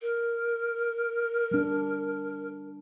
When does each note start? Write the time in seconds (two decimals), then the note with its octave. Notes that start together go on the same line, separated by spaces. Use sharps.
0.01 A#4
1.51 G3 D4